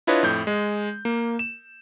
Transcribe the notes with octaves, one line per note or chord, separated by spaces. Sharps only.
D4 E4 F4 B4 C#5 D#5
F2 A2 G6
G#3
A#3
E7